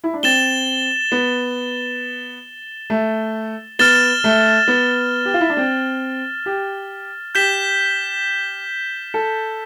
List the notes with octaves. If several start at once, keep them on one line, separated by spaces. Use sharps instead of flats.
E4
D4
C4 A6 E7 G7
B3
A3
B3 F6 A6 E7 G7
A3
B3
G4
F4
E4
D4
C4
G4
G4 G6 B6 E7 G7
A4